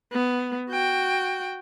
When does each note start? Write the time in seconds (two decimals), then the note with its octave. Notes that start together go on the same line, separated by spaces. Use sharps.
0.12 B3
0.70 F#4 G5